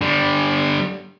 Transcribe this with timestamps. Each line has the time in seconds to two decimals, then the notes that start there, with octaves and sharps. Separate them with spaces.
0.02 D3 G3